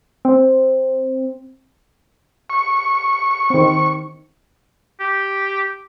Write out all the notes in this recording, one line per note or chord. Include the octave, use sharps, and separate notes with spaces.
C4
C#6
D#3 C4
G4